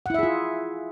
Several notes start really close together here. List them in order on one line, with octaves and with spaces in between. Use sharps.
F#5 E4 E5 G#4 F4